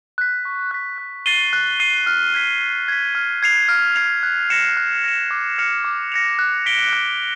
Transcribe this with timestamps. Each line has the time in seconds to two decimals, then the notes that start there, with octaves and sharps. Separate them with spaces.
0.18 F#6 B6
0.45 C#6
0.71 F#6 B6
0.98 F#6
1.26 A6 C7 D#7 G7
1.53 F#6
1.80 A6 C7 D#7 G7
2.06 F6
2.34 G#6 B6
2.61 F6
2.88 G#6 B6
3.15 F6
3.42 G#6 C7 F7
3.68 F6
3.96 G#6 C7 F7
4.23 F#6
4.50 A#6 C#7 E7
4.77 F#6
5.04 A#6 C#7 E7
5.31 D6
5.58 F6 A#6 C#7 F7
5.84 D6
6.12 F6 A#6 C#7 F7
6.39 F#6
6.66 B6 D7 G7
6.93 F#6